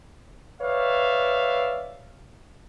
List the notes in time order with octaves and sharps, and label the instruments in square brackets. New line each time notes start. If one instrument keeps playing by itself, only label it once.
[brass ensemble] B4 C#5 D5 E5 F5